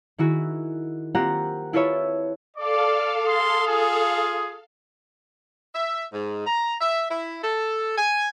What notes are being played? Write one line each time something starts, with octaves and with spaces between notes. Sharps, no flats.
D#3 E4 F#4 G#4
A#3 C4 F4 G4 F#5 A#5
E4 F4 A4 B4 C#5 E5
A4 D5 F5 D6
G#4 C6 D#6
F4 G#4
E5
G#2
A#5
E5
E4
A4
G#5